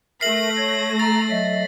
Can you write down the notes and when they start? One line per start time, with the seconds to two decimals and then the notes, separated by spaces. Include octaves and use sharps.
0.21 A3 A#4 E5 A#6 C7 F#7
0.57 C#5
0.99 A#5 A6
1.31 F#3 D#5 E5